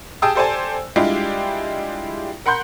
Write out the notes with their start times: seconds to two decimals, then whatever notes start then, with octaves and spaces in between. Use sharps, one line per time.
0.22 G4 G#4 G5 A5 D#6 E6
0.35 G4 A4 C5 D5 G#5 A5
0.96 G3 G#3 D4 E4 F4 G4
2.46 A#4 F#5 B5 C6 G6